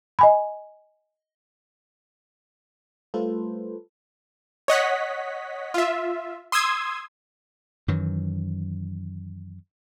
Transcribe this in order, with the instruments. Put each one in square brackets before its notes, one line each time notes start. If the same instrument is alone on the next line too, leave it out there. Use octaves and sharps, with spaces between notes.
[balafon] D#5 G#5 B5
[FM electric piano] G3 A3 F4 A4 B4 C5
[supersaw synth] C#5 D#5 F#5 B6
F4 E5
C6 D#6 E6 G#6
[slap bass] F#2 D#3 E3 F#3